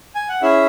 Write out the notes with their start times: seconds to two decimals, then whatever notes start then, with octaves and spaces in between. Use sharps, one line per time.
0.15 G#5
0.29 F#5
0.42 C#4 E4 G#4 E5